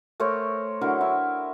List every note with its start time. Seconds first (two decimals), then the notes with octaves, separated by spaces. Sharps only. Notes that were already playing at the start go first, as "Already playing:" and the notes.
0.20 A3 A#4 C5 C#5
0.81 D3 F#3 E4 A#4
1.01 E4